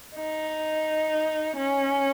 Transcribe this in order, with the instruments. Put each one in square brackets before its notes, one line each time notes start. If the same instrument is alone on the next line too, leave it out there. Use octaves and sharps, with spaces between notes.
[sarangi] D#4
C#4